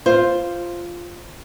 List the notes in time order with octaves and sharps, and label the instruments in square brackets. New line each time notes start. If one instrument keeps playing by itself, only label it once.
[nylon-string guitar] F4 [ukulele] C5